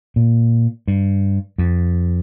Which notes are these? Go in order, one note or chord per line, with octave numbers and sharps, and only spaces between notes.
A#2
G2
F2